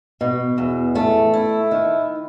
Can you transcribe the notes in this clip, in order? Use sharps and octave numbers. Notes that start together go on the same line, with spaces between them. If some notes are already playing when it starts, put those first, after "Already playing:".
B2
E2
A3
E4
D#3